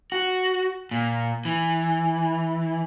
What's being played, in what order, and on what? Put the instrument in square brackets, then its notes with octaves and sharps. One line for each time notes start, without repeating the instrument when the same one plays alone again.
[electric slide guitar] F#4
A#2
E3